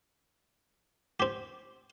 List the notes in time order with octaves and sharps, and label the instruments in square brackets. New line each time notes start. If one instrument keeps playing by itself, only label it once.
[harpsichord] C4 G4